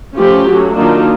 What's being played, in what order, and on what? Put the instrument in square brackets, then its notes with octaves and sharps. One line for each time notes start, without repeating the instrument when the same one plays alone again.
[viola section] F3 A3 C#4 F4 G4
F#3 A3 C#4
D#3 F#3 A#3 D4 D#4 F4